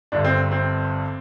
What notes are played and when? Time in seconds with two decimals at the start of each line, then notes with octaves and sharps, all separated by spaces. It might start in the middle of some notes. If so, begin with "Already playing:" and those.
0.12 G1 G2 D3 D4
0.25 C4
0.51 C4